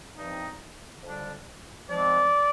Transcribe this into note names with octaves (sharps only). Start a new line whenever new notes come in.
G2 F3 C4 D#4
F2 D3 G3 D4
G#2 F3 G#3 C4 D5